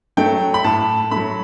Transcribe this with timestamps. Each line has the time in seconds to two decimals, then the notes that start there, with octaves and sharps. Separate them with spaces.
0.17 F#3 A3 G5
0.54 B5
0.64 A2 A5
1.11 F#3 A3 B5